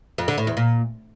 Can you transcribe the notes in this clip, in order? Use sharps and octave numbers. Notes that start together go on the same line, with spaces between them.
F2
D3
A2
E2
A#2